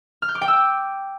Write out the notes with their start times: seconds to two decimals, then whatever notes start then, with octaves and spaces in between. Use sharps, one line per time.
0.22 F6
0.29 G6
0.35 D6
0.42 G5
0.48 E6